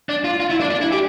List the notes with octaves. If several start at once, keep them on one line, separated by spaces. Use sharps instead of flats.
D4
F4
F4
E4
D4
D4
E4
G4